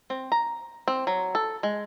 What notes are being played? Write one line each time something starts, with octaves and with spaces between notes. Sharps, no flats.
C4
A#5
C4
F#3
A4
G#3